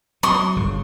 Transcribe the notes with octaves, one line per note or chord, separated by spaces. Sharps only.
F#3 C6 C#6 D#6
G1 C#3